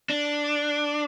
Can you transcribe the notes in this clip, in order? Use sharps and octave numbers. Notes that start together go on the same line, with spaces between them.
D4